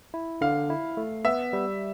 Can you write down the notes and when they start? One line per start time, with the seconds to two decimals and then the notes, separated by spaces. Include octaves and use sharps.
0.14 E4
0.41 D3 F5
0.70 E4
0.97 A3
1.25 B3 E5
1.53 G3